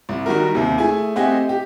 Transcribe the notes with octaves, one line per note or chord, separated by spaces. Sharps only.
C2
D#3 G3 F#4 A#4
D#2 C3
A3 E4 G#4 G#5
A3 C4 G4 D#5 F#5 G#5
G4